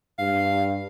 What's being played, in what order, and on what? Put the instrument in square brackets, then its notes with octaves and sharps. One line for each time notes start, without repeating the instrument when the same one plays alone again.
[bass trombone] G2 [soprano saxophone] F5